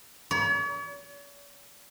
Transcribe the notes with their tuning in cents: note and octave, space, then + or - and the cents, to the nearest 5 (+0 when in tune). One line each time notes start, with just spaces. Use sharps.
C#5 +45